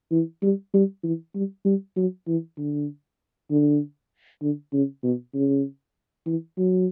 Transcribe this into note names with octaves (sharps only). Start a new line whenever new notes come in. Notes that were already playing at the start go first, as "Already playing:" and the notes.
E3
G3
G3
E3
G3
G3
F#3
E3
D3
D3
D3
C#3
B2
C#3
E3
F#3